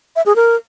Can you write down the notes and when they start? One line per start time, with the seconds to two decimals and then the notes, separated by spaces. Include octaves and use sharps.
0.16 E5
0.26 G#4
0.36 A#4